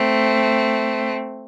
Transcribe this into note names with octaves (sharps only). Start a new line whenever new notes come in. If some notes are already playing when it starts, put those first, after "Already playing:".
Already playing: A3 C4